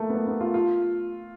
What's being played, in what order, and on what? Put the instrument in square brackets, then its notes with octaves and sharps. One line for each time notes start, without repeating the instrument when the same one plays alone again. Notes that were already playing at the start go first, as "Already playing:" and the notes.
Already playing: [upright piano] A3 A#3
B3
A#3
B3
F4
F4